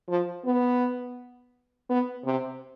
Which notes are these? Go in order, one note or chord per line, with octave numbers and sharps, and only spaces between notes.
F3
B3
B3
C3